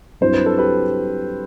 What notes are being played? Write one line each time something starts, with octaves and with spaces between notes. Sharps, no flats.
G2 F#3 C4 E4 C5
B4
A4
G4 B4